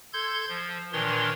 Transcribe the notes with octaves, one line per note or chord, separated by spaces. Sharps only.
A4 C6 G6 G#6
F3
A#2 D#3 E3 D4 C#5 C6